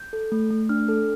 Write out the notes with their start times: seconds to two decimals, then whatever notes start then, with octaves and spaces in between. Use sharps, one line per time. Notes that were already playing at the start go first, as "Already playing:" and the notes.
Already playing: G6
0.13 A4
0.32 A3
0.51 A3
0.69 D4 F6
0.88 A4